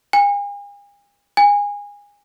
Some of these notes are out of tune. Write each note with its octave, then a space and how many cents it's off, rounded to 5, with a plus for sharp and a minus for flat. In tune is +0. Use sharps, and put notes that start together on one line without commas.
G#5 -45
G#5 -25